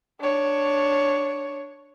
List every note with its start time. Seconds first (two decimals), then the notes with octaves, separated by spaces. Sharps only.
0.20 D4 C#5